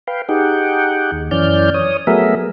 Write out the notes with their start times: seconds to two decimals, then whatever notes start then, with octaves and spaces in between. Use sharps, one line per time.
0.07 B4 F5 G5
0.29 D#4 G4 G#4 F#5 G5
1.12 D#2
1.31 F#2 E3 C#4 D5 F6 G6
1.74 C#5 D#6
2.07 F#3 A3 B3 G#4 A#4 E5